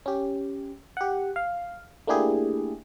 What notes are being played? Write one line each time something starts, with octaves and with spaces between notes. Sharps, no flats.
C#4 G4
G4 F#5
F5
A3 A#3 D4 E4 G4 G#4